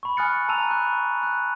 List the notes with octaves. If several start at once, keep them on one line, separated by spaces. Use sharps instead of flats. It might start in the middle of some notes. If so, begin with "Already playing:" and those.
B5 C#6
G#5 D#6 F6 F#6 A6 C#7
A5 A#5 E6 D#7 F7
A5 B5 C#6 F#6
F#6